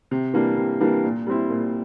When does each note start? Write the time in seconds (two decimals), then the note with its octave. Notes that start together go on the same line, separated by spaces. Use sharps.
0.11 C3
0.34 E3 G3 A#3 D4
0.57 C3
0.80 E3 G3 A#3 D4
1.04 A#2
1.27 G3 C4 E4
1.50 A#2